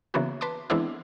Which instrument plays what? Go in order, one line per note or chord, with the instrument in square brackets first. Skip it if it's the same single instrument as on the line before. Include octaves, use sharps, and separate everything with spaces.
[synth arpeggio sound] C#3 E3 A#3 B3 F#4
B4 A5 C6 D6
E3 G#3 B3 C4 D4 E4